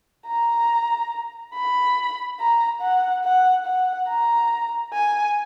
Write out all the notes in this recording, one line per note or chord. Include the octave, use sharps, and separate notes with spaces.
A#5
B5
A#5
F#5
F#5
F#5
A#5
G#5